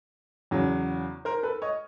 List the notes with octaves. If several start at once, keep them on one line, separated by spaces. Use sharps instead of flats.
E2 C#3 F#3
A#4 C5
A4 B4
C#5 D#5